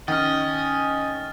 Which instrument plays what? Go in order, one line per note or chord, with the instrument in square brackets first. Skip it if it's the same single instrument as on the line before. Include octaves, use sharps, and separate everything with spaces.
[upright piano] D#3 [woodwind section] C#4 [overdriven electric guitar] D#5 [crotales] F6 A6